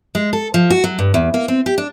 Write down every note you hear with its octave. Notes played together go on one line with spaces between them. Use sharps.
G#3
A4
F3
F#4
F#3
G2
E2
A#3
C4
G4
D4